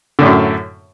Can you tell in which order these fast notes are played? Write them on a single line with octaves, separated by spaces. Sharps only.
D3 A2 F#2